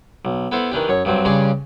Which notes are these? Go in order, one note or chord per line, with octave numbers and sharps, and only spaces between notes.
B1
B3 E4 A4 C5
D#3 E3 D4 G4
F#2 C#5
G2 F#3 C4
G2 C#3 C#4 D5 C6 D6